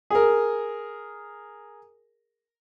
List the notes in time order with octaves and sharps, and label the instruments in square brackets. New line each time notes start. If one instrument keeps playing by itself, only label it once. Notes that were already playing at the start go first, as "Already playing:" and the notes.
[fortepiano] G#4 A#4